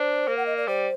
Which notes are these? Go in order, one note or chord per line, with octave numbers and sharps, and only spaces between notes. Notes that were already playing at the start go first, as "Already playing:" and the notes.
Already playing: D4 C5
A#3
F#5
D#5
D5
G3 C5